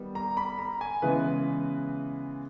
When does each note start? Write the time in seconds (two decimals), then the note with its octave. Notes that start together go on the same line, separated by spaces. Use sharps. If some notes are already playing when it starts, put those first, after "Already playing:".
Already playing: D#3 G3 B3
0.15 A#5
0.37 B5
0.59 A#5
0.81 G#5
1.02 C#3 E3 G#3 B3 B4